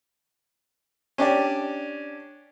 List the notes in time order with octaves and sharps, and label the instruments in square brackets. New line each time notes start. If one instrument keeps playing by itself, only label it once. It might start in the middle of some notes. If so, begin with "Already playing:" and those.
[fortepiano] C#4 D4 G4 D5